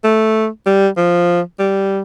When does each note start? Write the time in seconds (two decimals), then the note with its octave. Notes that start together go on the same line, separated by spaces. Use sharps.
0.04 A3
0.66 G3
0.97 F3
1.59 G3